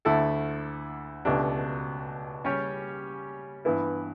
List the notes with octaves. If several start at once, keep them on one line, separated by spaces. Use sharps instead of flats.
D2 D3 A3 E4 A4
C#2 B2 A3 D4 G4
C#3 G3 C#4 G4 C#5
G2 E3 B3 E4 B4